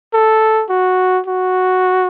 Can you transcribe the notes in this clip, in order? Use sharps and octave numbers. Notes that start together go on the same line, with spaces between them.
A4
F#4
F#4